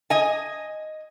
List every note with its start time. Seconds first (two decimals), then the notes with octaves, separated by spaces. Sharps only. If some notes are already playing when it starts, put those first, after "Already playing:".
0.10 D#5 G#5